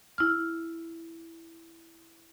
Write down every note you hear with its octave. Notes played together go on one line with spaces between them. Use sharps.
E4 F6